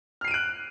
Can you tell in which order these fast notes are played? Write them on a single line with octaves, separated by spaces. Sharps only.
F6 C7 D#7 D7 F#6